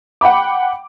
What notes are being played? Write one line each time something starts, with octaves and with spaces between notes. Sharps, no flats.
F#5 G5 B5 D6